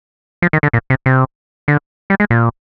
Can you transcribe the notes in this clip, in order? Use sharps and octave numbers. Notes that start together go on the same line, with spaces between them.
F3
D#3
D3
A#2
C3
C3
D3
G3
G#3
A#2